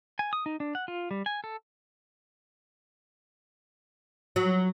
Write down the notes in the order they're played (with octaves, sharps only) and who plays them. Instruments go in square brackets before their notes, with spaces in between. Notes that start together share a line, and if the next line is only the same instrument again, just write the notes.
[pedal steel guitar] G#5
D#6
D#4
D4
F#5
F4
G3
G#5
A4
[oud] F#3